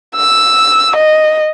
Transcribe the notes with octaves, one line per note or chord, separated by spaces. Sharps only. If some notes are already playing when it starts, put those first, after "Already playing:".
E6
D#5